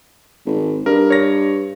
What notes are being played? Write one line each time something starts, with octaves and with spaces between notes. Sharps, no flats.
G#1
G2 A#4
C#5 A#6